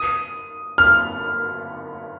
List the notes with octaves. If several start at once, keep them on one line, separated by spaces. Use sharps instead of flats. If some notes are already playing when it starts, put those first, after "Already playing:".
Already playing: D#6
F6